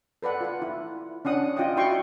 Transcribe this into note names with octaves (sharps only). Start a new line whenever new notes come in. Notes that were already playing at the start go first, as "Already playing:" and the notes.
A4 B4 D5 F#5
F4 F#5
E4
C#4 D4 F#5 D#6
F4 D#5 F#5 G5 D#6
E4 F#4 D5 G5 C6 C#6